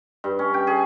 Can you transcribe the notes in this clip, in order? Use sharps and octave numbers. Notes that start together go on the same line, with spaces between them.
G2
C#4
G5
G#4